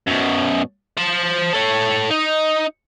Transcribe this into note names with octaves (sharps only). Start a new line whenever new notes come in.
F#2 B2
C5 A5
A4 C#5
D#4